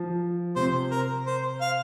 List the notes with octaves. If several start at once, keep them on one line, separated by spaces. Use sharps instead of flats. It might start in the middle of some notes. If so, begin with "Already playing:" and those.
Already playing: F3
C3 C5
A#4
C5
F5